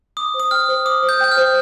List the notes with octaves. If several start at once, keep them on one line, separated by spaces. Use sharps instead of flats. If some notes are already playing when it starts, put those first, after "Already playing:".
D6 D#6
C5
D#6
G5 F6
C5
D6 D#6
C5
G6
G5 G6
F6
C5